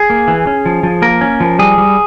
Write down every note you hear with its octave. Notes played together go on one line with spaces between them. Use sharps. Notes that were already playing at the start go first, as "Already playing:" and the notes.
Already playing: G#4
A#3
E3
C#4
F3
F3
A#3 A#4
C#4
F3
G3 G#4
G3